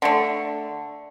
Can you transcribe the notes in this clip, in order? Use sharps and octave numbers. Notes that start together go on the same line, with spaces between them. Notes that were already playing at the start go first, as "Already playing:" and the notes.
D3 A3